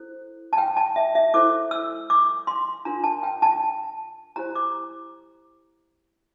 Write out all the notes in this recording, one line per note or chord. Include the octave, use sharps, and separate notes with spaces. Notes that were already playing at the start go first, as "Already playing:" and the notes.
Already playing: E4 A4 C5
A5
G5
A5
E5
E5
E4 A4 C5 D6
E6
D6
C6
D4 F4 A#4 A#5
A5
G5
A5
E4 G4 C5 A#5
D6